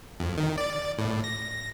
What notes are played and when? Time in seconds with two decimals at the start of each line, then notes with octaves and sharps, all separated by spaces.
0.20 F2
0.37 D#3
0.58 D5
0.98 A2
1.24 A#6